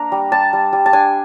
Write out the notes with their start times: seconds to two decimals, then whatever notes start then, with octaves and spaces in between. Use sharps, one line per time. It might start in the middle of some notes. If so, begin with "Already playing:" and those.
Already playing: A#3 D4 A#5
0.12 G3
0.32 G3 A5
0.53 G3
0.73 G3
0.86 A5
0.93 D4 G#5